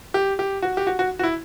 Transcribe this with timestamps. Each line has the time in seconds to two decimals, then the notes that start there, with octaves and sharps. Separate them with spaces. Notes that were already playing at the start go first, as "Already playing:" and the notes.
0.14 G4
0.39 G4
0.62 F#4
0.77 G4
0.87 F#4
0.99 F#4
1.19 F#4
1.23 E4